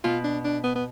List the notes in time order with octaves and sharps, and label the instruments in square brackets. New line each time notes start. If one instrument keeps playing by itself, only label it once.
[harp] B2 [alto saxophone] F4
[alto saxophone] D4
D4
B3
B3